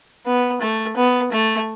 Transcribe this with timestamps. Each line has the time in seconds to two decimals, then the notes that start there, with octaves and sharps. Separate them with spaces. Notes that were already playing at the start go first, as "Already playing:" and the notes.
0.26 B3
0.62 A3
0.96 B3
1.32 A3